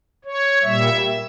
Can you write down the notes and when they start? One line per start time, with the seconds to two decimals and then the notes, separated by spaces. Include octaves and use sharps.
0.25 C#5
0.63 A#2 G3 E5